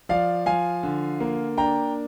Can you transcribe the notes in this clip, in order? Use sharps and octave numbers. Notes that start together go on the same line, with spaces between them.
F3 D5 F5
F3 F5 G#5
D3
A#3
D4 G5 A#5